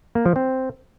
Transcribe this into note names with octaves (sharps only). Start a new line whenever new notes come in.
A#3
F3
C4